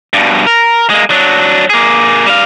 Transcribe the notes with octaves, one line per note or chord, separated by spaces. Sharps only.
G2 B2
A#4
G#3 A#3
F#3 D4
A#3 G#4
G3 F5